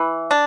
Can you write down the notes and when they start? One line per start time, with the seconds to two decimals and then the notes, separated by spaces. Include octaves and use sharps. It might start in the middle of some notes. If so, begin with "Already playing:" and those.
Already playing: E3
0.31 D4